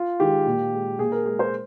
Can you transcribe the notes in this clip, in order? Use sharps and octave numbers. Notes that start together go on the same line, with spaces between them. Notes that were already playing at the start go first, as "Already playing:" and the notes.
Already playing: F4
D#3 G#3 G4
A#2
G#3
A#2 G#4
A#4
G#3 G#4
C5